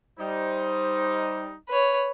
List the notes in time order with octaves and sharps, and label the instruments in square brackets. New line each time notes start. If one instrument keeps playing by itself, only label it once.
[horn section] G3 D#4 [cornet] C5
[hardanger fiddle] B4 C#5